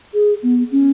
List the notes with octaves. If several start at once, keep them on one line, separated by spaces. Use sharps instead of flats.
G#4
B3
C#4